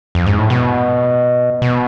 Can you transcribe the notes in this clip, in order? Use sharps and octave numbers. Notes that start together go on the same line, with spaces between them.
F2
G#2
A2
B2
B2